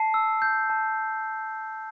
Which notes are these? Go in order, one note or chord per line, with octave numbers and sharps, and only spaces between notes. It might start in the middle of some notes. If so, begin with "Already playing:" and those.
Already playing: A5 C7
E6
G6
A5